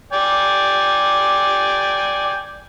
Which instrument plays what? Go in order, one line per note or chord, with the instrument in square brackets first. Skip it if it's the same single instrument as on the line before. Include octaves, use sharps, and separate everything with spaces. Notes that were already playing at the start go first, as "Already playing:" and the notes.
[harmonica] D5 G5 G#5